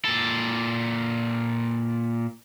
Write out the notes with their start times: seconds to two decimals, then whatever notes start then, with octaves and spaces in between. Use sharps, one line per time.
0.05 A#2 A4